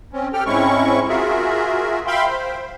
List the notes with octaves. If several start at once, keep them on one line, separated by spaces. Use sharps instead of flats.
C4 C#4
G4 A4 G5 F6
G#2 G#3 C4 C#4 E4 C#6
F4 F#4 G#4 A#4 E5
E5 F5 G5 B5 C6
C5